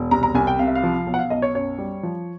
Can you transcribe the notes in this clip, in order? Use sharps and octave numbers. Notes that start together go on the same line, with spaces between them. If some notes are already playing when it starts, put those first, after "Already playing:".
Already playing: E1
C2 A#5
A#5
C2 G#5
G5
C3 F5
E5
F5
F3
B1
F#5
F5
B1 D#5
C#5
F#2 C#5
G3
F3